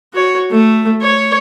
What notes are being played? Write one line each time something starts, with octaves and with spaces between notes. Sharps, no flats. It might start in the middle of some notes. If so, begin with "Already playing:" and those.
F#4 C#5
A3
C#5